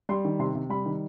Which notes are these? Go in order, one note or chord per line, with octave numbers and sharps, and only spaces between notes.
G3 C6
D#3
C3 C6
C3
G3 B5
D#3